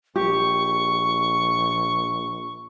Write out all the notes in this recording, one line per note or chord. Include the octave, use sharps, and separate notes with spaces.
A#1 G4 C#6